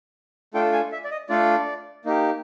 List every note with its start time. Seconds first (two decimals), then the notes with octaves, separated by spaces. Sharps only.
0.54 A3 D4 F4 A4 G5
0.73 G#5
0.92 E5
1.04 D5
1.11 D#5
1.29 A3 D4 F4 A4 D5
2.05 A#3 D#4 G4